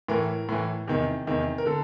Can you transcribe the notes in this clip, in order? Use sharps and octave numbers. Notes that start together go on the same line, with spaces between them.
A2 E3 A#4
A2 E3
E2 C3 D#3
E2 C3 D#3
A#4
D3 A4